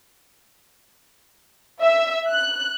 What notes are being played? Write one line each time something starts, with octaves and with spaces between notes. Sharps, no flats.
E5
F#6